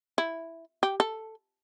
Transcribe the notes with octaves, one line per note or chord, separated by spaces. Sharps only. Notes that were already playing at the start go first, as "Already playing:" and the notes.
E4
G4
A4